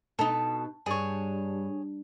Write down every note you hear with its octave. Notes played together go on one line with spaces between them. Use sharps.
B2 D#4 A4
G2 G#4 C#5